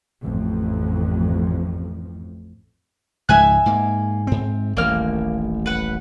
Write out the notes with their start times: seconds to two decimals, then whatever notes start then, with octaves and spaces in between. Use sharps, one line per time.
0.20 A1 F2
3.29 C#2 G#2 F3 E5 G#5 F#6
3.66 G#2 A#3
4.27 G#2 C4
4.77 D#1 A1 A2 A#3 F6
5.66 B4 F#5